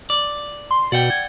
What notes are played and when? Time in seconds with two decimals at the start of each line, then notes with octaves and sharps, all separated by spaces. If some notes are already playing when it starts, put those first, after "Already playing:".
0.10 D5
0.71 C6
0.92 B2 D5 F#5 G5
1.10 G#6